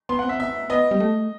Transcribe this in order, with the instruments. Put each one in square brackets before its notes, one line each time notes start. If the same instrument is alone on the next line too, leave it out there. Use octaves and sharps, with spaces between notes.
[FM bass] B3 [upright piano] C6
[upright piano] F#5
[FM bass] C4
[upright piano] E5
[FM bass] B3 [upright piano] E5
[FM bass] B3 [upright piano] D#5
[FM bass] G3
A3